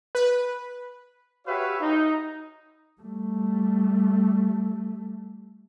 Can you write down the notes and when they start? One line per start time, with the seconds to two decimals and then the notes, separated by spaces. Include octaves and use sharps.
0.15 B4
1.46 F#4 G4 B4 C#5 E5 F5
1.80 D#4
3.01 G3 A3